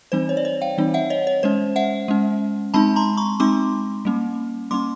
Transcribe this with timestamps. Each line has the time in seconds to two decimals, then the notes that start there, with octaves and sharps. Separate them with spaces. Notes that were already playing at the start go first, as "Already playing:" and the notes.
0.12 E3 G3 C4 D#4 C5
0.29 C#5
0.37 D5
0.45 C#5
0.62 F5 G5
0.78 E3 G3 C4 D#4
0.94 E5 F#5
1.10 C#5 D#5
1.27 C#5
1.43 G#3 C#4 C5
1.76 E5 F#5
2.08 G#3 C#4
2.74 G#3 C4 D#4 A5 B5
2.96 A#5 C6
3.17 B5 C#6
3.40 G#3 C4 D#4 C6 D6
4.05 G3 A#3 C#4
4.71 G3 A#3 C#4 C6 D6